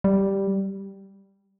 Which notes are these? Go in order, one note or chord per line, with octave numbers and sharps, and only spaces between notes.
G3